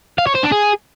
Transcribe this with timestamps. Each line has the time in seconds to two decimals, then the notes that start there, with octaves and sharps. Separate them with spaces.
0.18 F5
0.27 C#5
0.35 C5
0.44 D4
0.52 G#4